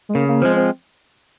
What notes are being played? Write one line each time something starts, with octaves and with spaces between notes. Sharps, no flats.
G#3
C#3 A#3
A#3
F3 G#3 C4
C4